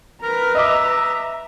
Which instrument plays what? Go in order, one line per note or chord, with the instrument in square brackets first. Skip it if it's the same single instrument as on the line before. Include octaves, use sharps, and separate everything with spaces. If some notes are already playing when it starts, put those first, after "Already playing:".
[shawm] A#4 [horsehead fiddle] B4 A#5
[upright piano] D#5 D6 [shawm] E5